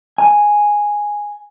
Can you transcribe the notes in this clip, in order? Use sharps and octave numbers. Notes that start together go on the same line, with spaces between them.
G#5